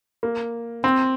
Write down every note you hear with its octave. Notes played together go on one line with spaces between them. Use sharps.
A#3
C4